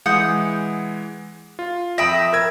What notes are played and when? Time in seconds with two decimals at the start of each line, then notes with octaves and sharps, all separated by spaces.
0.06 E3 G#3 F#5 D#6 G6
1.59 F4
1.98 F2 E5 G5 B5 D#6 A#6
2.33 A#4 E6 G#6